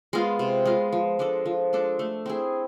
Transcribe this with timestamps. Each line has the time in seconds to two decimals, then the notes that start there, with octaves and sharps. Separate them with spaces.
0.13 G#3 B3 F4
0.39 C3
0.66 G#3 B3 F4
0.93 F3
1.19 G#3 D4 A4
1.46 F3
1.73 G#3 D4 A4
1.99 A3
2.26 C4 E4 G#4